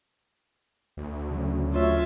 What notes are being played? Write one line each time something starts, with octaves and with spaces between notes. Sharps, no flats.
D2
C#3 F#3
A3 C#4 F4 C#5 E5